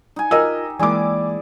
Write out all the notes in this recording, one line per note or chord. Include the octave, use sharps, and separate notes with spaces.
D#4 G#5
F4 G4 A#4 D#5 E6
E3 G#3 A#3 E4 G#4 D5 G#5 D6